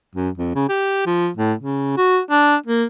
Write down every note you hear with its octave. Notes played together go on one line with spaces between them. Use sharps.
F#2
F2
C#3
G4
F3
A2
C#3
F#4
D4
A#3